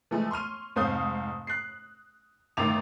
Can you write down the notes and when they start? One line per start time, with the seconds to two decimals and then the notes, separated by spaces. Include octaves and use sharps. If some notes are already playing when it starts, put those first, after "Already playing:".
0.11 E3 F3 G#3 A3
0.31 C6 C#6 F6 D#7
0.76 F1 G#2 C4 F5 D#6 G6
1.47 F#6 C7
2.57 G1 A2 D#3 E5 D6 F7